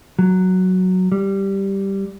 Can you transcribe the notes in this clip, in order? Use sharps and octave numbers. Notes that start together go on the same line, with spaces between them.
F#3
G3